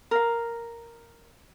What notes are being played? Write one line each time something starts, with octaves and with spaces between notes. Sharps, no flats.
A#4 F5